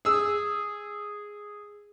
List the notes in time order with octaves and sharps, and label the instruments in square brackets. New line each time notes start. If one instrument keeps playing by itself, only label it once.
[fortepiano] G#4 E6